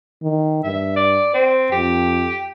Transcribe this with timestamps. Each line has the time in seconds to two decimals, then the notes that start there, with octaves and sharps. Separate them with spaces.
0.22 D#3
0.64 G2 E5
0.96 D5
1.34 C4 C5
1.72 F2 G4